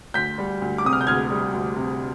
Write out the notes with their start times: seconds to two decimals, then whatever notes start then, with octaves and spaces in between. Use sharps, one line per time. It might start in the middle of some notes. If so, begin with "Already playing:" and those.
0.14 D2 G6 B6
0.38 G3
0.62 D2
0.78 D6
0.85 C3 D#6
0.93 F6
1.01 G6
1.07 D2 F6 G#6
1.30 G3
1.53 D2
1.76 C3